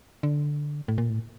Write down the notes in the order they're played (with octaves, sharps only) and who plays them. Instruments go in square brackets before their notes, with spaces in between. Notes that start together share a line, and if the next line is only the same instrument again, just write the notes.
[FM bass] D3
A2
A#2
A2